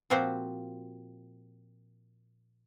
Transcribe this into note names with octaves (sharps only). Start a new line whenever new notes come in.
A#2 F3 C4 F#4 G4 C5